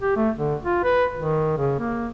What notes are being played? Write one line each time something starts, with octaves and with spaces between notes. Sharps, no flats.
G4
A3
D3
F4
B4
D#3
C#3
A#3